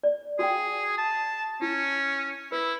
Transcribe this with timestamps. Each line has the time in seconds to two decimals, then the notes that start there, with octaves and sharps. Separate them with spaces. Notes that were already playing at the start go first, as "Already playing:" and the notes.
0.03 D5
0.39 F#4 G#4 F5 G5
0.98 A5
1.62 C#4 E4
2.52 E4 B4